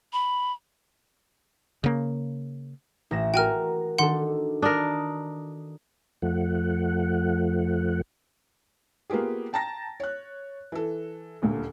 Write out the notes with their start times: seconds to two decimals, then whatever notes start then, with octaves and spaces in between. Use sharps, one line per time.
0.13 B5
1.84 C#3 A#3
3.11 A1 A#6 E7
3.34 F#4 A#4 G5 G#5 F6
3.98 D#3 D4 A4 F#5 C6
4.62 D4 A#4 D#6
6.22 F2 F3 A3 F#5
9.10 A#3 B3 F4 G4 G#4
9.53 G5 A5 A#5 A6 A#6
10.00 C#5 F#6
10.72 E3 A4
11.42 D#1 D2 A#2